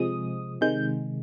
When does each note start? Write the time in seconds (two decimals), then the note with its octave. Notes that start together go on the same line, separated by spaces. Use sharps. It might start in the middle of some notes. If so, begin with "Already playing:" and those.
Already playing: C3 F3 G#3 D#6
0.61 C3 D#3 G#3 G6